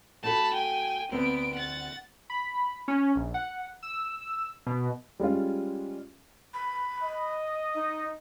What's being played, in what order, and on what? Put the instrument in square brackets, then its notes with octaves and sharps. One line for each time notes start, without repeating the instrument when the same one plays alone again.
[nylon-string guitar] A3 F#4 A4 [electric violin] A5 B5
[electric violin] G5 G#5
[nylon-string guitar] D2 C4 [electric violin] B3 D7
[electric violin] F#5 A6
[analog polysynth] B5
C#4
A#1
F#5
E6
B2
[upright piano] G3 G#3 C#4 F4
[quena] B5
[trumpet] D#5
[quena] D#4